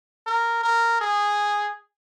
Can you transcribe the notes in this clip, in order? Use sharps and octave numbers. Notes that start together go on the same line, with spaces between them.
A#4
A#4
G#4